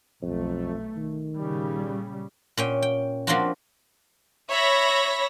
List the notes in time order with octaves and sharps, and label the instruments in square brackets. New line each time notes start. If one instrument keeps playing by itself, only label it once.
[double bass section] B1 A3 [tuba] F2
[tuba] D#3
[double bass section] A#2 C#3 G3
[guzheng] A#2 C#4 G5
G5
F3 A#3 C4 D4 F4 F#4
[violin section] C#5 E5 B5 A#6